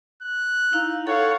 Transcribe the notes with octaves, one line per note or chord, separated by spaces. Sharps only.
F#6
D#4 E4 F5
A4 C#5 F5 F#5